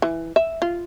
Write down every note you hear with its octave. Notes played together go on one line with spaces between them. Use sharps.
E3
E5
F4